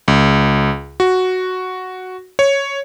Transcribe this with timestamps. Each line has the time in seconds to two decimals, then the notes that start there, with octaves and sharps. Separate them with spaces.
0.08 C#2
1.00 F#4
2.39 C#5